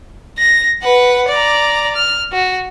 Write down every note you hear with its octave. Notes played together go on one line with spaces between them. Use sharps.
A#6
B4 F#5
D5 A#5
F6
F#4